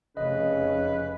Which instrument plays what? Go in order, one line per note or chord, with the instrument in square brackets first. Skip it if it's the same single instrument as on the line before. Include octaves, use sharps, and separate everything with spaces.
[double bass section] F1 C#4 [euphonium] C#3 [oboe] B4 [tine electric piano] D#5